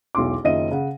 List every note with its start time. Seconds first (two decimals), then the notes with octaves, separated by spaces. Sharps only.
0.15 E1 B1 E4 C6 D6
0.44 F#1 D#3 F4 D#5 E5 D#7
0.71 C#3 F#5